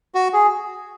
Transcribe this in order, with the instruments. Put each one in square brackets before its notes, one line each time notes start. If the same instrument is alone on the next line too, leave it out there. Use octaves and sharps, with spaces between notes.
[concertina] F#4
G#4